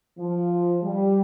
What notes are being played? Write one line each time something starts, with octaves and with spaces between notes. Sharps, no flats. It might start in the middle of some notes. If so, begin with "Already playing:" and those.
F3
G3